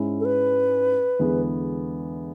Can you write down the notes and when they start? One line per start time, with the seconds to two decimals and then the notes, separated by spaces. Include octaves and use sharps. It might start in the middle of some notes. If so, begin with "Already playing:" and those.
Already playing: G#2 G#3 C#4 E4
0.20 A4
0.25 B4
1.19 E2 D3 G#3 B3